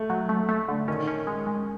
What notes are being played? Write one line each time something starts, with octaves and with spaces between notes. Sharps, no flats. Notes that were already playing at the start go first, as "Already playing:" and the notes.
Already playing: A3
F#3
A3
A3
D3
D#3 C#4
C#4
G#3
G#3